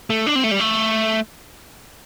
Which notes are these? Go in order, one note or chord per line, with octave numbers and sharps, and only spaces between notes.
A3
D4
C4
A3
G3
A3